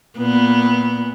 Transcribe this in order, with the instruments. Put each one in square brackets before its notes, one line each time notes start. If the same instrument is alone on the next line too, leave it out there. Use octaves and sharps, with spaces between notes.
[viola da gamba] A#2 B3